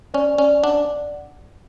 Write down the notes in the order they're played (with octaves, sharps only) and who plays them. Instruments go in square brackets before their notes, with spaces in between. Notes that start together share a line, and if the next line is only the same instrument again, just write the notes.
[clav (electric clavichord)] C#4 [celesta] D5
[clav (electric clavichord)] C#4 [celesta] D5
[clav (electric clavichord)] D4 [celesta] F#5